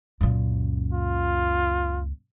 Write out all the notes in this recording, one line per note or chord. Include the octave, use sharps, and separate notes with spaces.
C#2 F#2 A#2
F4